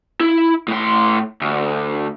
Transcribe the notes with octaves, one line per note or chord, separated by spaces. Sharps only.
E4
A2 C6
D2